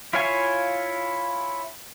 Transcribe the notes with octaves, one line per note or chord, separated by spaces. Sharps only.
E4 F4 C#5 F5 G#5